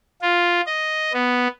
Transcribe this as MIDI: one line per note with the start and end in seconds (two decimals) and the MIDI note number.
0.22 0.61 65
0.66 1.12 75
1.13 1.47 59